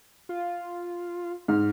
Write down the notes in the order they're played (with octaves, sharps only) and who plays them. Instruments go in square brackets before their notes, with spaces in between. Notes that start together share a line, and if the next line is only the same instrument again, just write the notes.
[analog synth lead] F4
[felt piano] G#2 [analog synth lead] F6